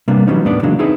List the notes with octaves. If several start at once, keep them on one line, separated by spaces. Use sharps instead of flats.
C3 G3 A#3 B3 D4
E3 F#3 G3 B3 C#4 D#4
D#2 A2 D#3 B3 D4 D5
C#3 E3 F#3 G#3 A#3 D4
C4 D#4 E4 G#4 B4